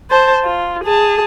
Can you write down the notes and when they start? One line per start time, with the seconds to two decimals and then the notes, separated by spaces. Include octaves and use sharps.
0.11 C5 A5
0.44 F4
0.84 G#4 A5